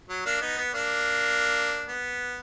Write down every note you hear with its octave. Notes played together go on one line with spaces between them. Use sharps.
F#3
A#3 D4
B3 D#4
B3
A#3 D4
B3